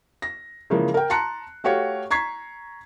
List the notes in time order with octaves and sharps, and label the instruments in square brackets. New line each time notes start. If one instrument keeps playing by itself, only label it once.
[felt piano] A#6
C#3 E3 F3 G#3 A#3
A#4 G5
A5 A#5 C6 F#6 C#7
A3 F#4 G4 C#5 F5
A#5 C#6 G#6 B6 C7